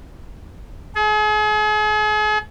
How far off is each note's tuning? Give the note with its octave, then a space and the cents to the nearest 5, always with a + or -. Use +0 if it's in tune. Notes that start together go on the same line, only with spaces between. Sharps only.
G#4 +40